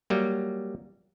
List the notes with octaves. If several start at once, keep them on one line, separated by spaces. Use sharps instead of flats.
F#3 G3 A#3